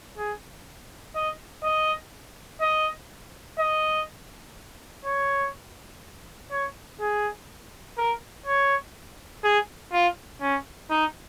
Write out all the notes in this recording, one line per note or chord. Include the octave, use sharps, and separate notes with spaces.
G#4
D#5
D#5
D#5
D#5
C#5
C#5
G#4
A#4
C#5
G#4
F4
C#4
D#4